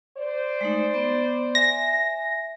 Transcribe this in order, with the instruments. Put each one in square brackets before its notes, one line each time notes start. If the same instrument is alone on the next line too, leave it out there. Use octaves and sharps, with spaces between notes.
[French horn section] C5 D5
[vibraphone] G#3 A3 D#4
B3
[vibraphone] E5 G#5 [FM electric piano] A#6